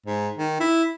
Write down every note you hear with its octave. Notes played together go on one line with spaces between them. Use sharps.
G#2
D#3
E4